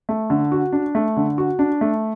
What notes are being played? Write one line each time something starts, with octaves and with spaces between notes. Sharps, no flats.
A3
D3
F#4
D4
A3
D3
F#4
D4
A3